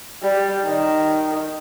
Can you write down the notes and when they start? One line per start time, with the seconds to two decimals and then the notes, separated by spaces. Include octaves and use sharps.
0.23 G3
0.66 D#3